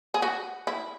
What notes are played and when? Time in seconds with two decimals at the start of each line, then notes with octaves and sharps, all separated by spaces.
0.14 G#4
0.22 F#4
0.67 E4